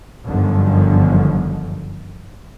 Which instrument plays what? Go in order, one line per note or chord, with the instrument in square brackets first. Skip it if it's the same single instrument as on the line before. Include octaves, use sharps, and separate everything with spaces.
[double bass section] G1 F#2 D3 D#3 F3